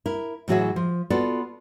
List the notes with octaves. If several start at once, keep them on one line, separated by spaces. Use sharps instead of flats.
E4 A#4
A2 E3 F#3 F#4 G#4 E5
F3
B3 F4 F#4 A4 D5